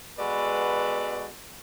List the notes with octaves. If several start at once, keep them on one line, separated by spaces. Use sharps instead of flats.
G#3 B3 F#4 A4 B4 D5